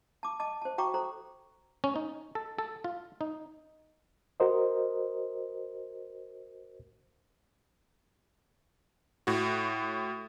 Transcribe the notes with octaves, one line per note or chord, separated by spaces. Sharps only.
A5 D6
D#5 A5 D6
C5 A5
F#4 G5 A#5 C#6 D6
A4 C5 A#5
C#4
D#4
A4
A4
F4
D#4
F#4 A#4 C5 D#5
A2 F#4